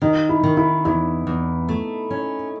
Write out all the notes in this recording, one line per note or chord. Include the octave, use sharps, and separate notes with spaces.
D#3 D#4
E4
D#3
E4
E2 E4
E2
A3
C#4